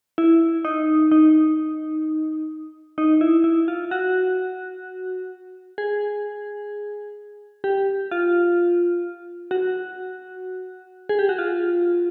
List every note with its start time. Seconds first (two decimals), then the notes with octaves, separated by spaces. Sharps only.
0.18 E4
0.65 D#4
1.11 D#4
2.98 D#4
3.21 E4
3.44 E4
3.68 F4
3.91 F#4
5.78 G#4
7.64 G4
8.11 F4
9.51 F#4
11.09 G#4
11.19 G4
11.29 F#4
11.38 F4